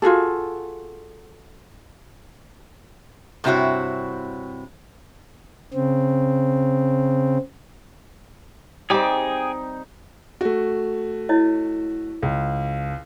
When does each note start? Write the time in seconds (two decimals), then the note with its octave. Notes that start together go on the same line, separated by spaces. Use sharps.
0.02 F4 F#4 G#4 A4
3.44 G2 C3 C4 E4 F#4 C#5
5.74 C#3 C4
8.90 G3 C4 D#4 G#4 G5 D6
10.41 A3 F#4
11.29 E4 C#5 D#5
12.22 C#2